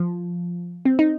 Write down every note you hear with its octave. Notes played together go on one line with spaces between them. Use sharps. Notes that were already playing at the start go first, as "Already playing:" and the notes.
Already playing: F3
C4
D#4